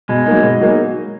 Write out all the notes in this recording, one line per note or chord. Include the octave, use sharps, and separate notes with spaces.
B2 G#3
F#3 A#3 D#4
B2
F#3 A#3 D#4